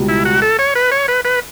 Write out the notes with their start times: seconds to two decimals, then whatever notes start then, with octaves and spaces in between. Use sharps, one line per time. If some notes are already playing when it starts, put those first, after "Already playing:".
Already playing: C#2 B2 G3
0.09 E4
0.25 F#4
0.42 A4
0.59 C#5
0.75 B4
0.92 C#5
1.08 B4
1.25 B4